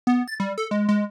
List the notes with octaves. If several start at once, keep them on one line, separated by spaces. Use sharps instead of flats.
B3
A6
G3
A4
G#3
G#3